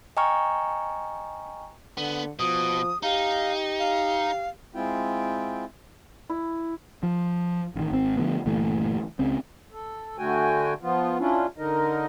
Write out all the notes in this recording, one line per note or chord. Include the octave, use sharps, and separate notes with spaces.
D#5 G5 G#5 A#5 C#6 F6
D3 B3
B2 F3 D#6
D#4 G4 F5
F5
G#3 C4 E4 F4 G5
E4
F3
A1 D#3
G#1 C4
D3 F3 A3 B3
G1 A#2 E3 A3
C#2 C#3 C4
A4
D3 A3 F#4 G5 G#5
F3 B3 F4
C#4 D4 E4 F4
D3 D#4 A#4 D#5